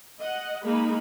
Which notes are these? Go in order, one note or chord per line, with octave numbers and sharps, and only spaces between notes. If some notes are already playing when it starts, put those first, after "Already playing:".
D#5 F#5
G#3 A#3 D#4 B5